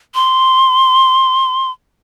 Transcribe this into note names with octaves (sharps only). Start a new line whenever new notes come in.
C6